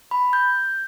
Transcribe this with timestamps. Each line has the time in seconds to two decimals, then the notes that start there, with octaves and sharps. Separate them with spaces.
0.11 B5
0.33 G6